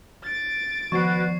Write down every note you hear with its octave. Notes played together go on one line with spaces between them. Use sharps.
A6 D7
D#3 F3 F#4 B4 C#6 G#6 C7